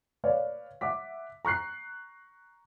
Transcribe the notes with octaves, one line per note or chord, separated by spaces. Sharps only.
B4 C#5 D5 F5
E5 F#5 D6 B6
A#5 C#6 F#6 C7